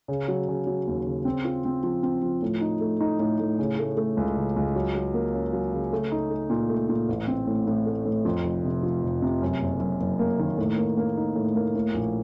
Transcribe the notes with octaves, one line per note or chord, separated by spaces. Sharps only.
C#3
F#3
C#3
F#3
D#2
C#3
C4
F4
C4
F3
C4
F3
A2
D#4
A3
D#4
A2
A2
C#3
A3
A3
C#2
C#3
C#2
F#3
F#3
A#3
C#4
F#3
C#3
A3
D#4
A3
A#2
A3
A#2
A1
C4
A2
A2
A3
A2
F2
F1
C3
F3
F1
C3
F#2
F#1
F#2
F#1
A#3
D#3
A2
A#3
A#3
D#4
A2
A#3
A2
A#1